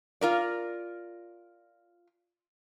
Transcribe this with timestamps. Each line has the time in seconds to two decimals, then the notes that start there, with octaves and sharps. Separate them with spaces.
0.21 F4 A#4 D5